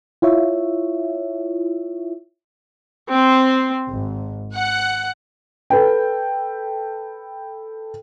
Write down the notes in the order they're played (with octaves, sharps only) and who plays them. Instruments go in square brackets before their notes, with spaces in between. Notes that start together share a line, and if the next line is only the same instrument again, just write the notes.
[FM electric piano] E4 F4 C#5 E5
[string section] C4
G#1
F#5
[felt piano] A4 B4 G5